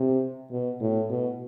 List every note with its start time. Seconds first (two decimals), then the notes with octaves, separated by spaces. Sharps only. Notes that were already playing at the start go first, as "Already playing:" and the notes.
Already playing: C3
0.51 B2
0.80 A2
1.10 B2